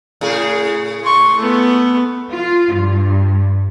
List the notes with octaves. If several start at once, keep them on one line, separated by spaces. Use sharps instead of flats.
A2 C#3 G#4
C6 C#6
A3 B3
F4
G2